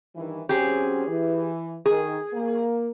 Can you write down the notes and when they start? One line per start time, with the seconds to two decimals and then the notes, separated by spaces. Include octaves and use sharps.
0.14 G2 D#3 E3
0.49 F#3 C4 C#4 G4 G#4
1.07 E3
1.86 D#3 G#4
2.33 A#3